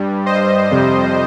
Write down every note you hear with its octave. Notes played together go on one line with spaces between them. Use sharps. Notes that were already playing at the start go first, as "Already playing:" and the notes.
Already playing: G2 G3
C5 D#5
F2 C3 G3